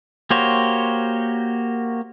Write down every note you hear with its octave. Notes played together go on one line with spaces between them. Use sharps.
A#3 F#4 G4 C5 C#5